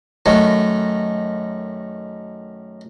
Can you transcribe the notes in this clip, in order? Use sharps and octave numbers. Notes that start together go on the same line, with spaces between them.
F#2 D#3 A3